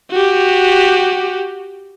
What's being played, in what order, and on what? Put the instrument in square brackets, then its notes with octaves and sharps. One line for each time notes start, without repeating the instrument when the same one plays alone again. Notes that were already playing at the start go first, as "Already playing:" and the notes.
[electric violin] F#4 G4